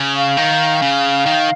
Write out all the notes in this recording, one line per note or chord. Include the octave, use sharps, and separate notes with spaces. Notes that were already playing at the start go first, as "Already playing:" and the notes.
Already playing: C#3
F5
D#3
C#3
D#3